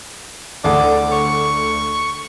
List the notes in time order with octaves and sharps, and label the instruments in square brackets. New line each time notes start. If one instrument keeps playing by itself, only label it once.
[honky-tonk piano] D2 [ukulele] E4 G#4 F#5 [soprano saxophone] D5
[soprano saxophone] C#6